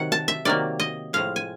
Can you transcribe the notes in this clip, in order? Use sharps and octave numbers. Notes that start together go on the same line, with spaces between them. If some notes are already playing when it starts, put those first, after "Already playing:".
Already playing: C3 D#3 F#3 F#5
A5
E5
C3 D#3 F#3 A#3 D5
D#5
A2 F3 G#3 F5
G#5